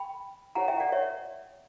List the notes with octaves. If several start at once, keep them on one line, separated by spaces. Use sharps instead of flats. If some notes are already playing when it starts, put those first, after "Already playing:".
Already playing: G5 B5
E4 G4 C#5 F#5 A#5
E5 G5
D5 F#5
C#5 E5